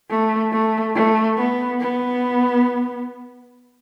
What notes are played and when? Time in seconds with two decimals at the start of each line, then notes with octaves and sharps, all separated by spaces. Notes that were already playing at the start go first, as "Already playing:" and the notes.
0.10 A3
0.53 A3
0.95 A3
1.38 B3
1.81 B3